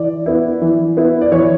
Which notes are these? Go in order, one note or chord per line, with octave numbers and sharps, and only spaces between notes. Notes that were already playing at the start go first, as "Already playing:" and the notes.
Already playing: E3 D5
B3 E4
E3
B3 E4
D5
E3 C#5